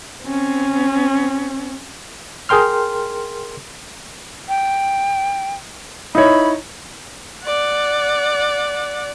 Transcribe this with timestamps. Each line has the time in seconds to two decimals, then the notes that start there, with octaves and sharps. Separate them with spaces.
0.23 C4 C#4
2.49 G#4 A#4 G5 C6 F6
4.49 G5
6.15 D#4 E4 C#5 B5
7.46 D5 F#5